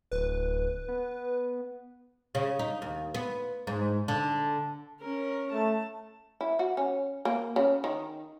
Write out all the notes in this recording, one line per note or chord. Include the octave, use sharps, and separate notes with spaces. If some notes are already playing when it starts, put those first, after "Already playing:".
D1 B4
B3
C#3
D#4
D#2
B3
G#2
D3
C#4 A#4
A3 A5
E4
F#4
C#4
A#3
C#3
D#3